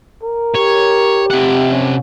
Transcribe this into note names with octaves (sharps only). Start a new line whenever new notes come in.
A#4
G4 C#5
C3 F#5
C#4